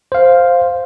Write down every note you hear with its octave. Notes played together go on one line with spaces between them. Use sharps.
C5 F5